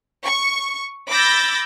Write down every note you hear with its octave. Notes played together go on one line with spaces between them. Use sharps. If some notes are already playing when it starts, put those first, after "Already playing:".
C#6
B5 D6 E6 G6 A6 A#6